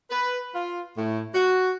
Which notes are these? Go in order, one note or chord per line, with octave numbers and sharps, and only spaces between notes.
B4
F4
A2
F#4